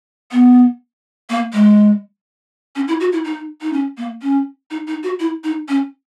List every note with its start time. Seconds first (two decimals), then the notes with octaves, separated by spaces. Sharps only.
0.32 B3
1.30 A#3
1.53 G#3
2.76 C#4
2.88 E4
3.00 F#4
3.12 E4
3.25 D#4
3.61 D#4
3.73 C#4
3.97 A#3
4.22 C#4
4.71 D#4
4.87 D#4
5.03 F#4
5.20 E4
5.44 D#4
5.68 C#4